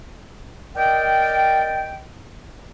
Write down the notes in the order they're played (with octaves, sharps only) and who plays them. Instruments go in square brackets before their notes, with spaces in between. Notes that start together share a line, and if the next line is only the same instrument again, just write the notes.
[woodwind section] A#4 D5 D#5 G5